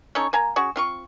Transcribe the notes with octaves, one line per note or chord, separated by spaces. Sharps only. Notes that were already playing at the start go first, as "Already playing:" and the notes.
C#4 D#4 A4 C#5
A#3 G#5 A#5
C#4 F#4 G#4
C4 F4 C#6